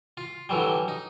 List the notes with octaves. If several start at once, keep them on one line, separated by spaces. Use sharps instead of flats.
F4
D3 E3 F#3 G3
D#4